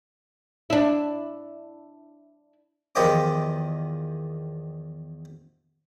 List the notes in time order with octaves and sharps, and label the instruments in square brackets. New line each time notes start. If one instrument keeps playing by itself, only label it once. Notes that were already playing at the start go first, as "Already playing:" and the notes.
[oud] D4 E4
[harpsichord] E2 D#3 F3 G4 D#5 D6